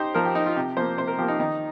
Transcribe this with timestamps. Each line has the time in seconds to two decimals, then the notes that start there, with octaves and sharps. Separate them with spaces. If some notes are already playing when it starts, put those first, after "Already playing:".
Already playing: D#4 G4 C5
0.14 F3 A#4
0.25 G4
0.35 D#4
0.46 F4
0.56 C3 G4
0.77 F3 A#3 C5
0.98 C3 C5
1.08 A#4
1.18 F3 A#3 G4
1.28 D#4
1.39 D#3 D#4